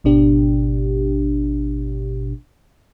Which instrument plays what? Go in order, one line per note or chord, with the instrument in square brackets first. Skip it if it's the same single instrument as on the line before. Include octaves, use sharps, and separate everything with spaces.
[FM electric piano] G#1 B2 D4 G4